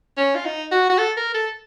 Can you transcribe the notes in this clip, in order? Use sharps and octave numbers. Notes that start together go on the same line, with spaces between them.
C#4
F4
D#4
F#4
F#4
A4
A#4
A4